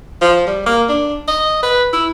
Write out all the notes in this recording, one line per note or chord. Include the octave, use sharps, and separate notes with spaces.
F3
G3
A#3
D4
D#5
B4
E4